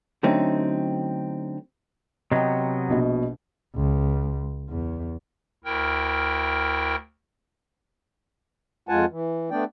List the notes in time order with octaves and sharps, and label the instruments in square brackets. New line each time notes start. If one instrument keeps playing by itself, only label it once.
[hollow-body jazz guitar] D3 F#3 A3 C4 C#4 D#4
[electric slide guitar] C3 F#3 B3 [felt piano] D#5 G5
[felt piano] A#1 B2 D#5
[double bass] C#2
E2
[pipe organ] D2 E4 A#4 G5
[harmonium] F2 G#3 F4 F#5 G#5 A5
E3
A3 B3 D4 D5 G5